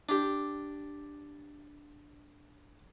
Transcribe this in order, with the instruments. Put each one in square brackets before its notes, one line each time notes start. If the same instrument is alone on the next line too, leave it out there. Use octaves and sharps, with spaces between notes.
[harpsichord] D4 G4